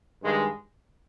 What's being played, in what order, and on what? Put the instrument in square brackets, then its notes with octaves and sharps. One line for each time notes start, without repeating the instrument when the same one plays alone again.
[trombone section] G2 D#3 G#3